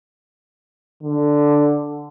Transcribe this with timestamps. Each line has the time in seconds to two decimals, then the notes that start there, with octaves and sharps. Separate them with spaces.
1.03 D3